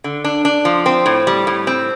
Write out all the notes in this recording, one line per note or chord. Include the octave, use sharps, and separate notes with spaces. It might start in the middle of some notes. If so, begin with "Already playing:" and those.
D3
D4
D4
F3
C4
A2
G3
A2
C4